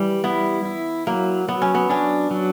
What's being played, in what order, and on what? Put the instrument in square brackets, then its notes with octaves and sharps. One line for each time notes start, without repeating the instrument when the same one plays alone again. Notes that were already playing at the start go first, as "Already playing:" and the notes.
Already playing: [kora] E3 [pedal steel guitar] G3
[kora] B3 [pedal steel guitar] E4
[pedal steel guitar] E4
[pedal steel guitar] F#3 [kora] A#3
[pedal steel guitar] F#3 [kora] B3
[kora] C#4
B3
[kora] C#4 [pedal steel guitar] D4
[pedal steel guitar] F#3